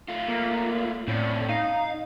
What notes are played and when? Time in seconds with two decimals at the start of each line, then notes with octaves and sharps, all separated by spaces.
0.08 A3 F4
0.28 A#3
1.08 A2 C4 C#4 D5
1.49 D#4 F5